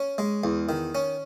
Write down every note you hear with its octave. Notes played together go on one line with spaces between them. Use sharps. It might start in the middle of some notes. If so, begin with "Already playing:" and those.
Already playing: C#4
G#3
E2
D#3
C#4